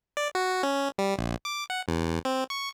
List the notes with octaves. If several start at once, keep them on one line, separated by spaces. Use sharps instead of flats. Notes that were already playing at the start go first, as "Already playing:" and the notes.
D5
F#4
C#4
G3
A#1
D6
F#5
E2
C4
C#6